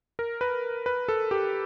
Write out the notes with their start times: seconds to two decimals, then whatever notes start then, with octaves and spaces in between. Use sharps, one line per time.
0.19 A#4
0.41 B4
0.86 B4
1.08 A4
1.31 G4